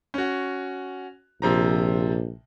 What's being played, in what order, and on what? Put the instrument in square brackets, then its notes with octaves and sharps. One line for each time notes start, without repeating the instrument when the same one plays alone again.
[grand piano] C#4 F#4
[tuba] A#1 [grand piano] C3 F3 A#5